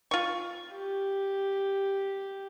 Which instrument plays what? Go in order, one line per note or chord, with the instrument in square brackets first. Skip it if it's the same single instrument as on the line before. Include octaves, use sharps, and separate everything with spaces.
[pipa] F4 C#6
[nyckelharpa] G4